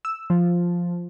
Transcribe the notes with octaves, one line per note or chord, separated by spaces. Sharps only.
E6
F3